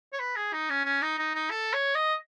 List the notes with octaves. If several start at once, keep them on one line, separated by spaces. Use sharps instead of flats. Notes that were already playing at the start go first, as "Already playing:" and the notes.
C#5
B4
G#4
D#4
C#4
C#4
D#4
D#4
D#4
A4
C#5
D#5